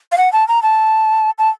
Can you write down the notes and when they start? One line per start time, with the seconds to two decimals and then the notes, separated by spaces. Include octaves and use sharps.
0.12 F5
0.18 F#5
0.33 A5
0.48 A#5
0.63 A5
1.38 A5